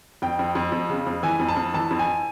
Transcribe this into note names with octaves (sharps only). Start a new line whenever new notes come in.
F2 G5
F2
F2
F2
C#3
F2
E3 G#5
F2
A5
F2
E3 A5
F2
G#5